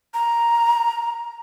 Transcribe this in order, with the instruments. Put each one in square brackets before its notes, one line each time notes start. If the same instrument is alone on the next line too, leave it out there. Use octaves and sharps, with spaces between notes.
[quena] A#5